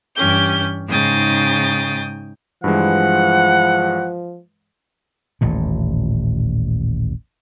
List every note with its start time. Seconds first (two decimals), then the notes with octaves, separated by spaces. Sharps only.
0.15 G2 E3 C#4 G4 G6
0.88 G#2 C#3 D#4 G5 D#6 A6
2.64 G2 E3 F3 G#3 F#5
5.41 D#1 A1 A#2